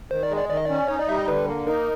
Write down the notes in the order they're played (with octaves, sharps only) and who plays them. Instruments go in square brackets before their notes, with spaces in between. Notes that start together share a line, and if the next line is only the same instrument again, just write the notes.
[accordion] D#3 [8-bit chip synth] C5
[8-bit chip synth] D5
[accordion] G#3
[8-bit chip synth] D5
[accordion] D#3 [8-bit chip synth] D5
[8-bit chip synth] D#5
[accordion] C#4 [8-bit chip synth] D5
[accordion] D#4 [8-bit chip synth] C#5
[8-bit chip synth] D5
[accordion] G3 [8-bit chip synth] E5
[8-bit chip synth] D#5
[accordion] D3 [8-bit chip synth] B4
[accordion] A#3
[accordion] D#4 [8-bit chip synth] A#4